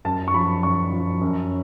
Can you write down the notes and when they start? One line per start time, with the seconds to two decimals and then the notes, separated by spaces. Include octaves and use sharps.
0.05 F#2 A5
0.28 C#6
0.34 F3 B5
0.63 F#2 C#6
0.92 F3
1.21 F#2